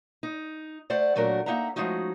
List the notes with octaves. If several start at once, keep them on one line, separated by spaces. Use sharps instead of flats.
D#4
A3 C5 D5 F#5
A#2 F#3 A3 D4 F#4 A#4
A#3 D#4 E5 F#5 A#5
F3 G#3 A3 C#4 D#4 F#4